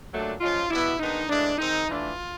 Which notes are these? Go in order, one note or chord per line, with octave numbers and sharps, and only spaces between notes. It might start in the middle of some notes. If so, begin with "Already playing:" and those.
A#2 F#3 A3 D4
F3 G#3 C#4 F4
B2 G3 B3 E4
D#3 G#3 B3 D4 D#4
A2 E3 G#3 D4
D#3 G#3 C4 D#4
E3 A3 D4 F4